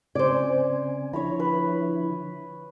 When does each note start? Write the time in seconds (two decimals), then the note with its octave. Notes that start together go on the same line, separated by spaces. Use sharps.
0.15 C#3 C4 C5 D5 G#5
1.13 D3 F3 E4 C#5 A#5 B5
1.39 B4